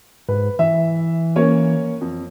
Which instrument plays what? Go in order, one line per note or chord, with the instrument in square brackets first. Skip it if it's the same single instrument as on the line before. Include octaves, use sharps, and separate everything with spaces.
[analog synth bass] G#2 [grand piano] B4
[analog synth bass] E3 [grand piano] E5
[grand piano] A#3 C#4 C#5
F2